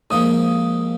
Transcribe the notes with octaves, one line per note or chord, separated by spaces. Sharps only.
G#2 F3 A#3 D#6